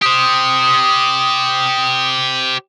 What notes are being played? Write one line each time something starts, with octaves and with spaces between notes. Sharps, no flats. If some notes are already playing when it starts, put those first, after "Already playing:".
G4 C5 D#6